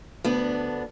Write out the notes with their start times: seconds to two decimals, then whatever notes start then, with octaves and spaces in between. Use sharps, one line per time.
0.24 D2 B3 D4